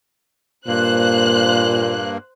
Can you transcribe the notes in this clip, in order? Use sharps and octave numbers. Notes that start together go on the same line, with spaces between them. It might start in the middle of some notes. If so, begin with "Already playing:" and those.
G2 A#2 A#3 C5 F#6